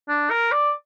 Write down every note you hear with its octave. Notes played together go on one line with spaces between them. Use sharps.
D4
A#4
D5